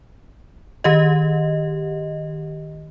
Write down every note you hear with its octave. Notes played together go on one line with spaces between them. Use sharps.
D#3 G4 D#5